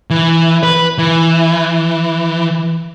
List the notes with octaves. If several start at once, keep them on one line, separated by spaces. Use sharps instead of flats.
E3
B4
E3